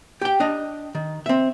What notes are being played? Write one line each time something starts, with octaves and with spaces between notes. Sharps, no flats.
G4 G5
D4 D#5
D#3
C4 E5